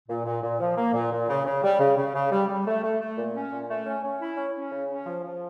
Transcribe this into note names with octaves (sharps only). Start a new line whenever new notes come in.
A#2
A#2
A#2
F3
A#3
A#2
A#2
C#3
C#3
G3
C#3
C#3
C#3
G3
G3
A3
A3
A3
A#2
C#4
A#2
A3
C#4
C#4
E4
C#4
C#4
C#3
C#4
F3
F3